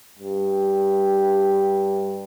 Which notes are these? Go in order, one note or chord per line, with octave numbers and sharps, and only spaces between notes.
G2